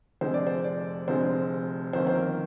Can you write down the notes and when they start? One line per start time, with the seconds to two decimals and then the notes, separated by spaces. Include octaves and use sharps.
0.21 F1 F2 D3 G#3 C5
0.34 D5
0.47 C5
0.64 D5
1.08 F1 F2 D3 G#3 C5
1.93 G1 F2 D#3 A#3 C5
2.07 C5
2.15 A#4